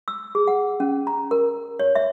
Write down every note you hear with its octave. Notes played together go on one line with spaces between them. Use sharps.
E6
G#4
F#5
C#4
A#5
A#4
C#5
E5